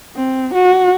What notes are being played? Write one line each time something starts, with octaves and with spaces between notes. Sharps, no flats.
C4
F#4